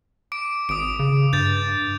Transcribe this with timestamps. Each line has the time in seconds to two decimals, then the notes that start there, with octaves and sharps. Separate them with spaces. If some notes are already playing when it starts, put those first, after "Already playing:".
0.32 D6 D7
0.69 G#1 D#6 D7
0.99 C#3
1.33 G2 G6 A6